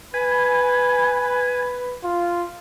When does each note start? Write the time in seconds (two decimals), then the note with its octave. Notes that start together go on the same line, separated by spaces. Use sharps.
0.14 B4 G#5 B5
2.04 F4